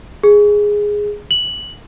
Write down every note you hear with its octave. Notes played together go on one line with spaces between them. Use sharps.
G#4
F#7